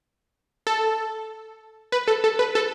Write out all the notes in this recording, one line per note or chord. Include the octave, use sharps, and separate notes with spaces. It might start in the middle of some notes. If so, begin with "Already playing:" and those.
A4
B4
A4
A4
B4
A4